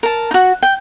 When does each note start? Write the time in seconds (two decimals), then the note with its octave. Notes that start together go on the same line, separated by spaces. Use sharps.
0.03 A#4 A5
0.31 D#4 F#4
0.62 G5